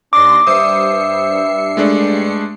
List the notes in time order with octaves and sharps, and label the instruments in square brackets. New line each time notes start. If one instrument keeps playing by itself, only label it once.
[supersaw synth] D#2 C6 A#6 [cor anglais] D4 [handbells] D6
[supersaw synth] G2 C7 C#7 [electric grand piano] C5 D#6 [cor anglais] E5
[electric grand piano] G#3 A3 D4